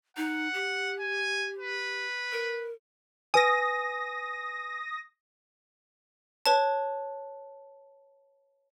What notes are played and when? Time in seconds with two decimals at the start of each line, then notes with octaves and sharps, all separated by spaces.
0.17 D#4 F#5
0.54 G4
1.00 G#5
1.58 B4
2.32 A#4
3.34 B4 G#5 D#6 A#6
6.46 B4 C#5 A5